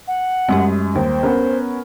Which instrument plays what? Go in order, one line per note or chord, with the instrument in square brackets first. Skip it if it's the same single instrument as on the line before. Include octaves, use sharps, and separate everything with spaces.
[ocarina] F#5
[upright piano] F#2 [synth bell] G3 G#3 G4
[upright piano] D#2 [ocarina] C5
[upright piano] B3 C#4 A#4